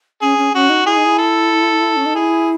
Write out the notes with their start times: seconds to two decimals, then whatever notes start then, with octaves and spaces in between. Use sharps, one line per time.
0.22 C#4 G#4
0.38 C#4
0.54 C#4 F#4
0.70 D#4
0.86 E4 G#4
0.96 D#4
1.05 E4
1.18 A4
1.97 C#4
2.06 D#4
2.15 E4 G#4